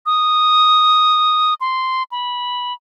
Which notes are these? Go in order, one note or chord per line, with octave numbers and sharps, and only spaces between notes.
D#6
C6
B5